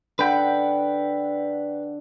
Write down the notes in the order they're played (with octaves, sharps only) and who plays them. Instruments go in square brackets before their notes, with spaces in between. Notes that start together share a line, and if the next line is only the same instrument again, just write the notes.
[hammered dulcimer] D3 F#5 [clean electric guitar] B4 G5